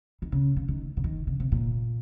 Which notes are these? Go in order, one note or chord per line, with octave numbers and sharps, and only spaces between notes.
D#3
C#3
C#3
D#3
C#3
D#3
C#3
C3
A#2